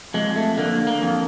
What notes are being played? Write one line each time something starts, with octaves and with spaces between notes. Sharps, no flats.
F2 G#3
A3
D3 A#3
A#3
F2